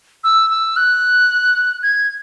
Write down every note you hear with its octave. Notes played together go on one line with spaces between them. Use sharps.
E6
E6
F#6
G#6